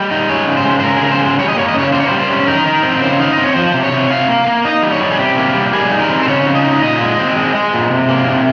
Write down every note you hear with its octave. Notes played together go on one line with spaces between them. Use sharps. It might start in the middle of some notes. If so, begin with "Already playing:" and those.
Already playing: G3 D#5
D#4
G#3 C#5
C#3
C5
G#3
C5
C#3 A#4
G#4
C#3 A#4
C5
G#3
G3 C#5
D#5
A#3 C#5
D#5
C#3 C#5
A#3 C5
C#5
C5
G3
C5
C#4
D#4 A#4
D#4
C4
C#3 C5
D#4 F5
C4 D#5
C#5
F3 C5
C3
C#5
C3
C3 F5
A#3
A#3
D#4 D#5
G3
C#5
G3
G#4
C3 G4
A#3
G3
G3 G#4
D#4
A#4
C4
C5
C#3 C#5
C#3
D#5
D#4
A#2 D#5
G#3
C4
G#3
G#3
A#2
C3
A#3
C3